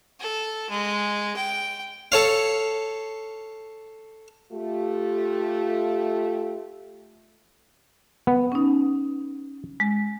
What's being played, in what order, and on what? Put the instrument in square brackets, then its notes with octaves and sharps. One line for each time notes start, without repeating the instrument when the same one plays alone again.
[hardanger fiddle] A4
G#3
G5
[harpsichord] A4 C#5 F5
[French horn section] A3 F4 G4
[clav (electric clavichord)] B3
[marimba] C#4 D#4
G#3